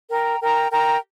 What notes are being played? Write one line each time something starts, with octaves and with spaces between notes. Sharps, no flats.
A#4 G5 A#5
A#4 G5 A#5
A#4 G5 A#5